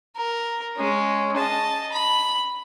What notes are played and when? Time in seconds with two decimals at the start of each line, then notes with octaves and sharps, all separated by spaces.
0.16 A#4
0.77 G#3 C#4
1.36 D#5 A5
1.92 B5